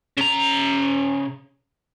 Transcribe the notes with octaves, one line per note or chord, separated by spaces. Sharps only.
C#3 A#5